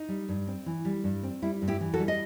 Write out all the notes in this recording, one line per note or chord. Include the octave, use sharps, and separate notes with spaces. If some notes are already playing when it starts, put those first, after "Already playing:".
Already playing: D#4
G3
G2
C4
E3
G3
G2
C4
G3 E4
G2
E4 G4
E3
F#4 A4
G3
D#5